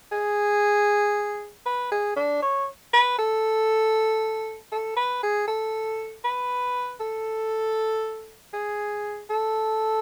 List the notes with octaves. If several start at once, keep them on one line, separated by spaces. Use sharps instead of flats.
G#4
B4
G#4
D4
C#5
B4
A4
A4
B4
G#4
A4
B4
A4
G#4
A4